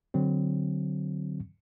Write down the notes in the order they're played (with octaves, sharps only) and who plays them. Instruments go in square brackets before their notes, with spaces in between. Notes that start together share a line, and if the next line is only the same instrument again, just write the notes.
[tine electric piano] D3 F#3 C4